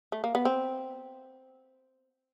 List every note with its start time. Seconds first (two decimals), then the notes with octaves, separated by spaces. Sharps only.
0.12 A3
0.24 A#3
0.35 B3
0.45 C4